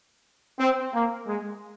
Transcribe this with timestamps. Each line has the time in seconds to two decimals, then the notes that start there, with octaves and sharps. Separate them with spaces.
0.59 C4
0.93 A#3
1.27 G#3